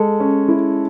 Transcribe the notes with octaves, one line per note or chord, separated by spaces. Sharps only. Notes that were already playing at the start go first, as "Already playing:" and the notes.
Already playing: G#3 A4
C#4
E4